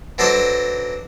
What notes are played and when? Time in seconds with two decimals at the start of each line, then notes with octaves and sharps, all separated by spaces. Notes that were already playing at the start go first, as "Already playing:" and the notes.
0.18 E3 F#3 D4 A4 C5 D#5